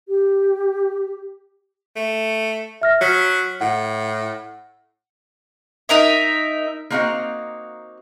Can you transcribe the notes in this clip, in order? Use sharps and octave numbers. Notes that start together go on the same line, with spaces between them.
G4
A3
E5 F6 A#6
F#3 F6 B6
A2 F#5
D#4 A#4 E5
A#3 C4 D#4 F#4 F5 F#5